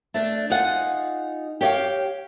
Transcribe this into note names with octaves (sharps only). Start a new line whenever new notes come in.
A3 D4
D#4 F4 G#4 F#5
G4 C#5 D5 F5 G5